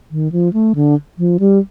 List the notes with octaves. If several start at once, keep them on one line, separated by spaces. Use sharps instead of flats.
D#3
F3
A3
D3
F3
G3